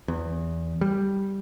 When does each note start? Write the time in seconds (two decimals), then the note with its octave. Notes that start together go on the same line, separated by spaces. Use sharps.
0.08 E2
0.81 G3